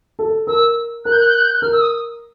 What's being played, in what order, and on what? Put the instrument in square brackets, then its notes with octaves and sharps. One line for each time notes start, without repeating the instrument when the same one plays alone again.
[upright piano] A4
[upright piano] A#4 [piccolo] E6
[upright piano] A#4 [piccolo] F#6
[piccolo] G6
F#6
G6
F#6
G6
F#6
[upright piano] A#4 [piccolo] F6
[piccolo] E6
D#6